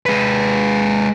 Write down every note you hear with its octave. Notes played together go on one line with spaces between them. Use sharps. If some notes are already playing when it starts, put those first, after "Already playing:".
G#3 B4